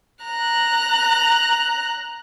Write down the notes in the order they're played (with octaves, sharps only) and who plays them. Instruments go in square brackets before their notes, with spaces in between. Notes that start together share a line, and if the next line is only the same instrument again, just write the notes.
[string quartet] A#5 F#6